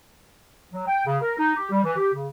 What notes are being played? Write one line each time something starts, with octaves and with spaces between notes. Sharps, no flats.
F#3
G5
C#3
A#4
D#4
G4
G3
E3
G4
C#3